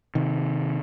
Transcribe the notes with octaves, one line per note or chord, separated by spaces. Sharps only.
C3 D#3